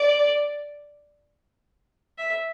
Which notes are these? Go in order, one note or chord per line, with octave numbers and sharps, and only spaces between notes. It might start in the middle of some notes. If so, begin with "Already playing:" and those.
Already playing: D5
E5